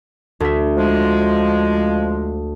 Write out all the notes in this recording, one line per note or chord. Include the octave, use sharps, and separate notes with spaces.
D2 E5
F3 G#3